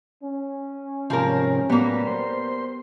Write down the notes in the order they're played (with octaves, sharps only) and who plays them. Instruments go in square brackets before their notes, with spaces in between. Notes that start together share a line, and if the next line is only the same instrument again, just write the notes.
[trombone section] C#4
[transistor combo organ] G#2 C3 G3 [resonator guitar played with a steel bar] F3 A#3 A#4
[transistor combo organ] A2 F#3 B4 [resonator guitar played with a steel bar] G3 A#3 [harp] B3
[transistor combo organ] C5 C6